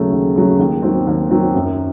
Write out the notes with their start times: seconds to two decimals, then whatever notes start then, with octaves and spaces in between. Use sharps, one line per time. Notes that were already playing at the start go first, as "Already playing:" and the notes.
Already playing: D#2 C#3 F#3 A3
0.11 D#2
0.35 C#3 F#3 A3
0.59 D#2
0.82 D#3 F#3 C4
1.07 D#2
1.31 D#3 F#3 C4
1.54 F#2